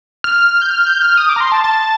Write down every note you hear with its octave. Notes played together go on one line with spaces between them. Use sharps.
F6
G6
F6
G6
F6
D#6
D6
A#5
C6
A5
A5